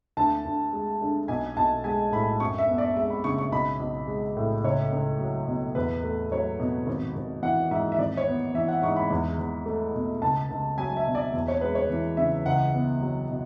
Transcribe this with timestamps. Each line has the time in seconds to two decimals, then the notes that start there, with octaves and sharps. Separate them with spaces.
0.17 D2 A5
0.45 D2
0.73 G#3
1.01 D3
1.28 B1 G#5
1.56 B1 A5
1.84 G#3 G#5
2.12 A2 B5
2.40 F#2 C#6
2.59 E5
2.68 B3
2.78 D5
2.96 G#3 E5
3.10 B5
3.24 C#3 C#6
3.38 C#6
3.52 B1 B5
3.79 B1
4.07 G#3
4.37 A2
4.64 C#2 C#5
4.92 C#2
5.20 F#3
5.47 B2
5.75 E2 B4
6.03 A3
6.31 F#3 C#5
6.59 B2
6.87 G#1
7.16 G#1
7.42 E3 F#5
7.71 G#2 E5
7.92 E5
7.98 G#1 D5
8.17 C#5
8.27 B3
8.54 E3 E5
8.68 F#5
8.82 G#2 C#6
8.96 B5
9.10 E2
9.39 E2
9.66 A3
9.95 B2
10.22 C#2 A5
10.51 C#2
10.78 F#3 G#5
10.97 E5
11.06 B2
11.15 D5
11.33 E2
11.48 C#5
11.61 G#3 B4
11.75 C#5
11.90 E3
12.17 C#3 E5
12.46 C#2 F#5
12.74 B3
13.01 F#3
13.29 B2